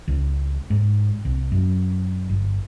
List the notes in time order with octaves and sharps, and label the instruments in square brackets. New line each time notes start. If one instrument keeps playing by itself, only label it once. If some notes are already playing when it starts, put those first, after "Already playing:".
[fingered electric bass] C#2
G#2
C2
F#2
G1